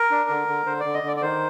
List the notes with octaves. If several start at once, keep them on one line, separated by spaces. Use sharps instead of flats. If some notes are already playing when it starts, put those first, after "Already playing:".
Already playing: A#4
D4
D3
D3
D3 C5
D3 D5
D#5
D3 D5
D5
D#3 C5